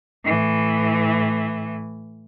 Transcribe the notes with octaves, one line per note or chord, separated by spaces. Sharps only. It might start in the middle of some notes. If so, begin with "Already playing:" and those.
A2 E3